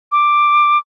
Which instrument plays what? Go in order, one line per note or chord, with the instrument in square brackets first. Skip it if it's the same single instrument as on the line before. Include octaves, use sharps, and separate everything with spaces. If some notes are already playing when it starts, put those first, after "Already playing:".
[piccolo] D6